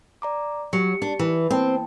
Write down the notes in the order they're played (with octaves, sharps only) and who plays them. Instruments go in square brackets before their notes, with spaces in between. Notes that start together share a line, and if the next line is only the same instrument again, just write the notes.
[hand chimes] D5 A#5 D6
[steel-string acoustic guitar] F#3 [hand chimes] G4 C#7
[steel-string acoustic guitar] D4
E3
[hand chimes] A#3 G5 A5 [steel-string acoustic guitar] C4